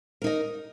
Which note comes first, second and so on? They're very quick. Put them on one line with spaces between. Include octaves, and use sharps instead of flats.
A#4 D#4 D#5